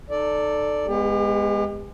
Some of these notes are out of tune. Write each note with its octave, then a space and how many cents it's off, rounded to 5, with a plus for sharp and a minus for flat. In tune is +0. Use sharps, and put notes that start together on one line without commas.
D#4 -30 A4 +0 D5 +0
G#3 -5 B3 +0 G4 +40